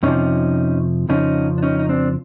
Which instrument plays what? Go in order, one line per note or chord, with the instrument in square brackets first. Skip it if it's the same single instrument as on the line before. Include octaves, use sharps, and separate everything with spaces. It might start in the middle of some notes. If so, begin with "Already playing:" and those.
[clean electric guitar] F2 C3 F3 C#4 D#4
F2 C#3 F3 C#4 D#4
D4
C#4 D#4
D#4
C4 D4